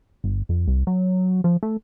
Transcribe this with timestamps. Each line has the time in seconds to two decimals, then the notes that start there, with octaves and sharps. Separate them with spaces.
0.24 G1
0.49 F2
0.68 C2
0.87 F#3
1.44 F3
1.63 A3